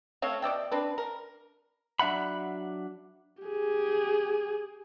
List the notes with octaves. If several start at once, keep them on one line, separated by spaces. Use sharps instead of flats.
A3 C4 C#5 F5
B2 D5 E5 G5
C4 D4 B4
A#4
F#3 D4 E5 F#5 B5
G4 G#4